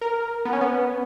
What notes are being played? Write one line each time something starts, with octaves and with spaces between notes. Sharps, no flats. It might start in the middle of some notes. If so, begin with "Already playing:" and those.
A#4
B3
C#4
B3